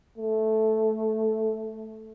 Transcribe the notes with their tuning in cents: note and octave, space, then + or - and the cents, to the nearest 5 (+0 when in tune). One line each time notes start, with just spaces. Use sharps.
A3 -5